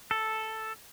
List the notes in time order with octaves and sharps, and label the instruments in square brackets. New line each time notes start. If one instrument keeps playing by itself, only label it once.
[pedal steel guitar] A4